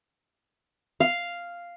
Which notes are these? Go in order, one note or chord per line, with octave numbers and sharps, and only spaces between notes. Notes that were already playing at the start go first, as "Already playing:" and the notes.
F5